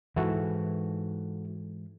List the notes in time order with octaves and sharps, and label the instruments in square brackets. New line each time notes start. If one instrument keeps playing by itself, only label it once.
[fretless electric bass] G#2 E3 [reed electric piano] E4 F#4 A4